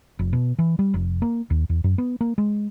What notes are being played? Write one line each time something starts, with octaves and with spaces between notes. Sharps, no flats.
F1
B2
E3
G3
F1
A#3
D#2
E2
F#2
B3
A#3
G#3